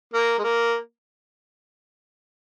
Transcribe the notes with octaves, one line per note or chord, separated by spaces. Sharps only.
A#3
G#3
A#3